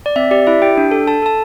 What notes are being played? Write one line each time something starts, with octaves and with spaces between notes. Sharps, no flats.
D5
C4 E5
G4 D5
E4 E5
G4 G5
D4
A4
A4 A5
A4 A5